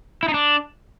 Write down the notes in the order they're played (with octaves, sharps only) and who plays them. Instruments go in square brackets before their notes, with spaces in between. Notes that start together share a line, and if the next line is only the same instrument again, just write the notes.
[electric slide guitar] E4
D#4
D4